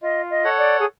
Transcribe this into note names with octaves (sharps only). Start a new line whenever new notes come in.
F4 D#5
D#5
A4 C#5 F#5
D5
G#4